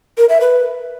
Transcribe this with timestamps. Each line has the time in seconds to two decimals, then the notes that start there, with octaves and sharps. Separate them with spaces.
0.18 A#4
0.29 E5
0.41 B4